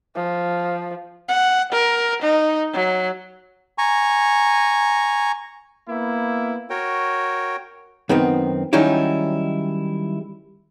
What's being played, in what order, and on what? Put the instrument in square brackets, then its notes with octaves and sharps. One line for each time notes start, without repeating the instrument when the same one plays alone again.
[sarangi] F3
F#5
A#4
D#4
F#3
[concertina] G#5 A#5 C#6
[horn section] A#3 B3 E4
[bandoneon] F#4 A#4 C#5 G5
[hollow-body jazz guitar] F#2 D#3 B3 C4
D#3 F#3 G3 C#4 D#4 E4